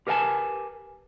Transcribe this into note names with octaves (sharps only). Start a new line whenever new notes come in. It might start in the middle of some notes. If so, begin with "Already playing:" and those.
G4 A#4 B4 F5 G#5 A5